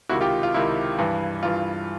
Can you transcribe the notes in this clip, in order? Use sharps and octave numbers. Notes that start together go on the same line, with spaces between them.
C#2 C3 D#3 E4 F#4
F4 G4
F4
C#2 C3 D#3 E4
G2 E3
G2 E3 F4